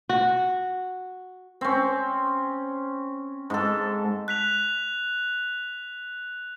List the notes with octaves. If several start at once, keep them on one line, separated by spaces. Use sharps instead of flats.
F#4
C4 C#4
G#2 A4
F#6 B6 F7